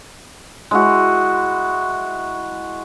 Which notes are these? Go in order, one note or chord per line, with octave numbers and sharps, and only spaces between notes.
G#3 E4 F#4